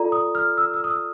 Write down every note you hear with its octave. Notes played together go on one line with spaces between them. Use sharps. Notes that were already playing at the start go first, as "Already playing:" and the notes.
Already playing: F4 A4 D5 A#5
D#6
F6
E6
E6
D#6
E6